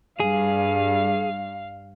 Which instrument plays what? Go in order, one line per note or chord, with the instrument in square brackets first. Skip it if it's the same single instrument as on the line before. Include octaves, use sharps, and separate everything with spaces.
[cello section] G2 [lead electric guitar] G#4 [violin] F5